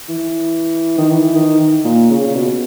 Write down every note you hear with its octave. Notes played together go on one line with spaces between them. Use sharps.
E3
D#3
E3
D#3
A#2
C#3
B2